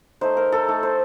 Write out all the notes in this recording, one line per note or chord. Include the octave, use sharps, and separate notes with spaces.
A3 D#4 C5
A#4
A4
A3 D#4
C5